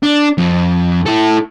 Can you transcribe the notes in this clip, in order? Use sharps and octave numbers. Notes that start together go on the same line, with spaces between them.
D4
F2
E4 A4